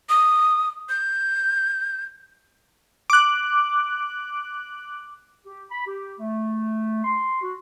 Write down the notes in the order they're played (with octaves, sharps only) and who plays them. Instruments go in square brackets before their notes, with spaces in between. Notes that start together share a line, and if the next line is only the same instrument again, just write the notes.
[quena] D#6
G6
[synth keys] D6 F#6
[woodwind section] G4
B5
G4
A3
C6
F#4